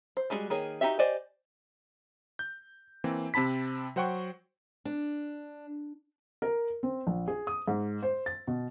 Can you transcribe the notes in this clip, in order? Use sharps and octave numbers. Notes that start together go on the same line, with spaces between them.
C5
G3 G#3 D4 F#4 G#4
D#3 A#3 G#4 C#5
D#4 E4 F#4 G4 E5
G4 C5 D5 D#5 G#5
G6
E3 A#3 C4
C3 C4 A5 B5 B6
F#3 C5 F#5 G5 C#6
D4
A#4
C4
A#1
G#4
D#6
G#2
C5
A6
B2